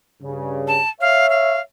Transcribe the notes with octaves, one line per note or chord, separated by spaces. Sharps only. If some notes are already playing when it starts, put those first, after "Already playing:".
G2 C#3
A5
C#5 E5 F5
F5